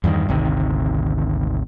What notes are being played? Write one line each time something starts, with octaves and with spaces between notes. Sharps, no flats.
E2 G2 D3 D#3
G#1 D2 C3 D#3